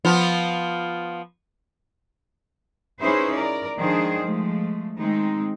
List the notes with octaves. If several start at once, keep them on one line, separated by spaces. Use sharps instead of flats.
F3 B3 F4
C#4 D#4 E4 G#4 B4 C5
A#4 D5
D#3 F3 G#3 D4 G#4 C5
F3 G#3 A3
D#3 G#3 C4 D#4